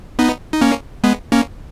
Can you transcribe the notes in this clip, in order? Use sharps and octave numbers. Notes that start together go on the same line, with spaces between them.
B3 D#4
D#4
A#3 C#4
G#3 B3
A#3 C#4